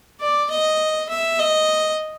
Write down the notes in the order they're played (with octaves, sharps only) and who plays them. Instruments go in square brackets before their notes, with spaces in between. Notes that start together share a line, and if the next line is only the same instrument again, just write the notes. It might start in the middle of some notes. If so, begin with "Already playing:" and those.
[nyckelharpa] D5
D#5
E5
D#5